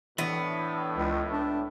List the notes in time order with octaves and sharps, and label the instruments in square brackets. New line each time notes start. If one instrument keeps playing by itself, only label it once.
[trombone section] A2 [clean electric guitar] E3 D4 [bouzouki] B3
[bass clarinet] C#2
D4